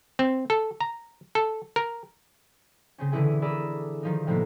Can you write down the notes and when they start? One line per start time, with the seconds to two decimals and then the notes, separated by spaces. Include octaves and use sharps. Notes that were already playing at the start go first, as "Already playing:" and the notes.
0.19 C4
0.50 A4
0.81 A#5
1.35 A4
1.76 A#4
2.98 C#3 C4 C#4
3.12 B2 D3 E3 C#4 E4 G#4
3.42 G#4 A#4 D5 B5 E6
4.03 D#3 F3 D#4
4.27 A2 C3 F3 A#3 B3 E4